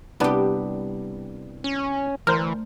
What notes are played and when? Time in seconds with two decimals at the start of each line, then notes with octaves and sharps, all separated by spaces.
0.20 C2 G3 B3 D4 G4
1.64 C#4
2.27 D2 E3 A#4 C5